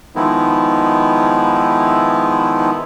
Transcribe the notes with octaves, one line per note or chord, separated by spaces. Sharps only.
D#3 F3 G#3 B3 D#4 E4